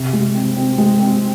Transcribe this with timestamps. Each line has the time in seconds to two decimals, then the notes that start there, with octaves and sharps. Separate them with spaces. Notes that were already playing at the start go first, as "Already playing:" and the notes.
Already playing: C3
0.13 G#3
0.35 C4
0.57 C4
0.78 G#3
1.00 C4